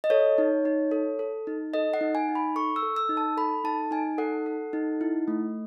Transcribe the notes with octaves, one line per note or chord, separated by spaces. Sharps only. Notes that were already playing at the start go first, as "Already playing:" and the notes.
D#5
A4 C#5
D#4
D#4
A4
A4
D#4
A4 D#5
F#5
D#4
G#5
D#4
B5
A4 C#6
E6
A4
E6
D#4
A5
A4 B5
D#4 A5
D#4 G#5
A4 F#5
A4
D#4
E4
A3